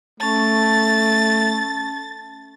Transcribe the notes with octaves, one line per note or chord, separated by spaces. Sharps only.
A3 C#4 A5 A6